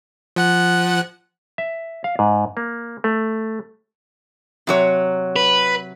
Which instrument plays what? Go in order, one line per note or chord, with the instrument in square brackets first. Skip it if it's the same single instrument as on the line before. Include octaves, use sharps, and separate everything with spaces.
[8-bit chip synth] F3 F#5 F#6
[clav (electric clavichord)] E5
F5
G#2
A#3
A3
[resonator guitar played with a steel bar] C3 F#3 C#5
[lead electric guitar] B4